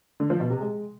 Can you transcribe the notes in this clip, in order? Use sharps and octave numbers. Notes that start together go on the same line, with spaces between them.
D3
F3
B2
C3
G#3